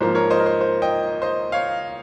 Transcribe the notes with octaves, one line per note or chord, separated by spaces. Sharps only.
G#2 F3 A#3 C5
A#4 C#5
C5 D#5
A#4
C5
C5
D#5 G5
C5 D#5
C#5 F5